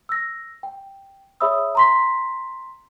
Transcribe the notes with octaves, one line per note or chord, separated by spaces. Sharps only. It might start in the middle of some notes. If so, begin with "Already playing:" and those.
E6 A#6
G5
G#4 C#5 E5 B5 D#6 E6
A#5 C6 B6